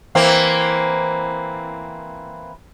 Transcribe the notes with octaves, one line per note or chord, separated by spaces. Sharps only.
E3 A#3 C4